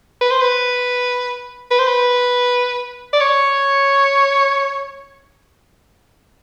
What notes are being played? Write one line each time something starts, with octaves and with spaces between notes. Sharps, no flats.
B4
C5
B4
B4
C5
B4
D5
C#5